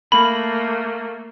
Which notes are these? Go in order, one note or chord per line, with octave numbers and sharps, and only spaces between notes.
A3 A#3 B5